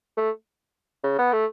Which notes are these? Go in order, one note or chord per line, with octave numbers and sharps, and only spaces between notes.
A3
C#3
B3
A3